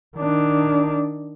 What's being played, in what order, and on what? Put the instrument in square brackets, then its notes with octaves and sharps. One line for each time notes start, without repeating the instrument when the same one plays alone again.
[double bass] D#3 D4